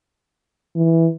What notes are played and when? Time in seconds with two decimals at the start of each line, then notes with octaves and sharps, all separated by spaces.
0.76 E3